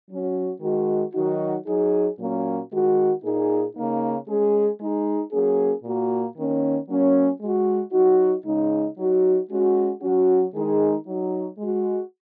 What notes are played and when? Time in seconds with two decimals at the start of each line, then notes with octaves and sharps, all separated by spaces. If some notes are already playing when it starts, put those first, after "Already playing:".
0.09 F#3 C#4 F#4
0.61 D#3 G#3 F#4
1.13 D#3 F#3 D#4 F#4
1.66 F#3 D#4 G#4
2.17 A#2 F#3 A#3 C#4 F#4
2.70 D#3 G#3 F#4
3.22 A#2 A#3 D#4 G#4
3.74 C#3 A#3 D#4
4.27 G#3 C#4 G#4
4.78 G#3 D#4 G#4
5.31 F#3 A#3 C#4 G#4
5.83 A#2 A#3 F#4
6.36 D#3 A#3 C#4
6.87 F#3 A#3 C#4
7.40 G#3 F#4
7.92 F#3 D#4 F#4
8.44 C#3 G#3 D#4
8.97 F#3 D#4 F#4
9.49 G#3 C#4 F#4
10.01 F#3 C#4 F#4
10.53 D#3 G#3 D#4 G#4
11.06 F#3 D#4 F#4
11.58 G#3 F#4